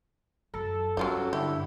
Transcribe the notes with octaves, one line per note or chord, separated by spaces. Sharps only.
F#2 A4
G2 F#3 C#4 F4 G4
D3 E4 G4